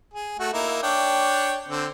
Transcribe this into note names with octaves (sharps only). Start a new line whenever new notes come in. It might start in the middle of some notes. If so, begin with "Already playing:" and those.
G#4
A3 F#4
A#3 D#4 E4
D4 C#5 G5
D3 C4